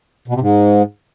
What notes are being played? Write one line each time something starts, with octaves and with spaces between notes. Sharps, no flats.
B2
C3
G#2